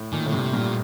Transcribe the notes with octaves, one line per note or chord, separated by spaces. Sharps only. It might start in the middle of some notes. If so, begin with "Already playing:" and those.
Already playing: A2
A#2 D#3
A2 D3
G2 C3
G2 A#2